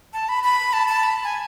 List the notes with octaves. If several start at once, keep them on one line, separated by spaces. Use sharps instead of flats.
A5
B5
B5
A5
A5
B5
G#5